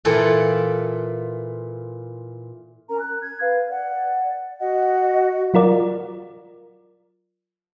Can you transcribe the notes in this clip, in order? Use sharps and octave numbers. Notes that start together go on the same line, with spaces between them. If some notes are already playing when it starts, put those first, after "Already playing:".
A#2 E3 F4 A4 F#5 G5
C#4 A#4 A#5
F#6
G#6
B4 F5
D5 F#5
F#4 D#5 F#5
F#3 F4 A#4 D5